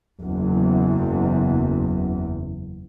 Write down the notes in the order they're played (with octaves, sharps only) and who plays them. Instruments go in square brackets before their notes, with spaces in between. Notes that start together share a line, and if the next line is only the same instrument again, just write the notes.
[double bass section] F#1 E2